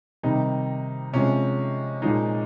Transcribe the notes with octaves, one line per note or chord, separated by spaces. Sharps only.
C3 D#3 G3 D#4
C3 F3 G#3 C#4
A#2 F3 G#3 D#4